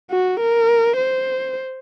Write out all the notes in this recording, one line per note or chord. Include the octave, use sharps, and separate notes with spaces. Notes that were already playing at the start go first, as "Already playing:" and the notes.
F#4
A#4
C5